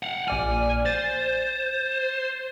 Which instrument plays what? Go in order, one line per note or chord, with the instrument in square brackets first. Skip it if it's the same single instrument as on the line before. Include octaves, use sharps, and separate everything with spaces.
[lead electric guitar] F5 F#5
[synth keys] A#1 D5 F6 [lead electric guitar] G#5
[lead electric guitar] C5 [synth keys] A6